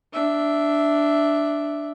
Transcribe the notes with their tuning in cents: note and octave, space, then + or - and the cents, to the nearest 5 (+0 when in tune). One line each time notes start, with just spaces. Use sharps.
D4 +0 E5 +0